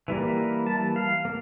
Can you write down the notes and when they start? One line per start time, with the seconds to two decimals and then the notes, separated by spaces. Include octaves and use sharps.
0.08 E3 G3 A#3
0.67 A5
0.96 F5
1.25 A#3